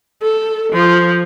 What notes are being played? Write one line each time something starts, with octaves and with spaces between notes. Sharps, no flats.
A4
F3